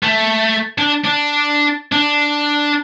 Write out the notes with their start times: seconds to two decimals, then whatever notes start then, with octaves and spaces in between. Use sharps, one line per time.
0.03 A3
0.78 D4
1.04 D4
1.92 D4